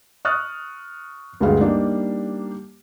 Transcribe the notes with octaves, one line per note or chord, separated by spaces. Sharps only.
C#6 D#6 F6 F#6 A6
D2 G2 G3 G#3 F5
G3 A#3 D4 D#4